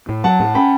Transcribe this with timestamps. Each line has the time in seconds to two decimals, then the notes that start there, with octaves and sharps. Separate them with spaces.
0.09 A2
0.24 F#3 F#5 A5
0.40 A2
0.55 C#4 G5 B5